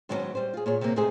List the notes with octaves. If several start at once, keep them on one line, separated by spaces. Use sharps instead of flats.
G#2 D#3 F#3 G3 B3 C#4
G3 C5
F4 G#4
A#2 G#4 C#5
C3 A#3
G#2 C3 A3 C4 G#4 C5